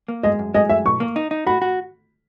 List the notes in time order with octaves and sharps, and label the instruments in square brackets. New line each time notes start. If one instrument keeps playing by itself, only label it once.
[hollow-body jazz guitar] A#3
[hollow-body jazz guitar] G#3 [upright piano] D#5
[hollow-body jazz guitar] F#2
[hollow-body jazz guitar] G#3 [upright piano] D#5
[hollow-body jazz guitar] F#2 [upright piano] E5
[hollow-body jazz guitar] B1 [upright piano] C#6
[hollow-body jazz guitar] A#3
D#4
D#4
[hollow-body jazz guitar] F#4 [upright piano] B5
[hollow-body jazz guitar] F#4